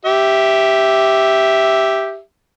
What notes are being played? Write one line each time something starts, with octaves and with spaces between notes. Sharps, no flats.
G4 E5